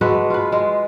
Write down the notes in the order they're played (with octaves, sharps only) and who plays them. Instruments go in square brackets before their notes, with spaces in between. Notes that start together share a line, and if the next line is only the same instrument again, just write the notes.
[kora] G#3 F#4 A4 B4
F4 B4
G#3